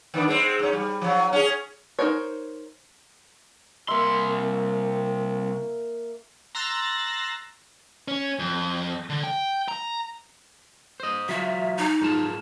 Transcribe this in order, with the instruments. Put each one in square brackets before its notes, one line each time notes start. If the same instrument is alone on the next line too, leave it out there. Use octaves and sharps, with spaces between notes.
[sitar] D#3 B3 D4
G#3 C4
G#2 C#4
G3
F3 F#3
C#4 G#4
[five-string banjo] D#4 F4 A#4 C5 C#5
[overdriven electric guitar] C2 C6 [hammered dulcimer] A#3 E5
[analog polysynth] A#5 C6 E6 F#6 A6 A#6
[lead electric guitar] C#4
F2
D3
G5
A#5
[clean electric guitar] C5 D#5
[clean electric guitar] F#3 F4 [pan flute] E5
[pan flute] D#4
[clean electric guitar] G#2 F4 A5